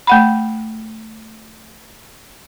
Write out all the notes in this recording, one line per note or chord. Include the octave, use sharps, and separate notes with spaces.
A3 F#5 B5